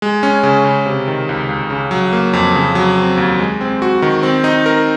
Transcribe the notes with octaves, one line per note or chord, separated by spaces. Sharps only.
G#3
C#4
C#3
C#3
C3
D#3
C#2
C#2
C#3
F#3
A#3
F2
C#3
F#3
C4
D#2
G#3
C4
F#4
D#3
C4
D#4
A#4